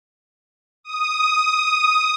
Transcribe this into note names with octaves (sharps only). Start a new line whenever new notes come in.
D#6